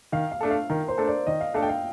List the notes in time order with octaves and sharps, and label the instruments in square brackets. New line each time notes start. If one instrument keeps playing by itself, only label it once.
[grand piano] D#3 [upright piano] F5
[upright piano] F5
[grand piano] A3 D4 A4
[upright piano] F5
[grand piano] D#3 [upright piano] A#4
[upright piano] C5
[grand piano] A3 D4 A4
[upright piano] D5
[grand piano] D#3 [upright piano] D#5
[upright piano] F5
[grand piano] A3 D4 A4 [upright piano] F5
[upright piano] G5
F5